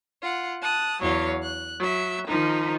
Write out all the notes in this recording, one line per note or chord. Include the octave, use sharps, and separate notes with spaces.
F4 F#5
A5 D#6 F#6
E2 F#3 C#5 F5
F#6
F#3 E5
D#3 F3 D#4